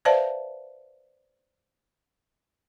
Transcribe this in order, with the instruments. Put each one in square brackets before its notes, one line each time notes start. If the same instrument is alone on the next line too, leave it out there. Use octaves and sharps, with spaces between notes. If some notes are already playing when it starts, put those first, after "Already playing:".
[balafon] B4 C5 D5 E5 F5 A5